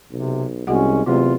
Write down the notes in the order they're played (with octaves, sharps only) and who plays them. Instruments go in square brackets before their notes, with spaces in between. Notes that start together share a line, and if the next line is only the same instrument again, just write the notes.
[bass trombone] B1 [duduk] C3
[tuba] C2 [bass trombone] G#3 [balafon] B3 F#4 F#5 [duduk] C#4
[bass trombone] E2 [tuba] C3 [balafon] F#3 A3 A#3 [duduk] F4